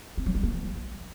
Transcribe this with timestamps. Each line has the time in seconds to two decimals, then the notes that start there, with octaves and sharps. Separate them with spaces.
0.17 C4
0.26 F#3
0.35 G3
0.43 A#3
0.52 E3